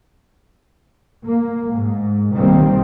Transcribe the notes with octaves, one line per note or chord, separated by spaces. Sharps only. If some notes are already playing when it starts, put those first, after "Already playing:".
A#3
G#2
B1 D#3 G3 A#3 C4